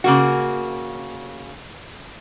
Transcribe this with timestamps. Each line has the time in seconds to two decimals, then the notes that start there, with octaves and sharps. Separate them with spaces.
0.04 C#3 A#3 F#4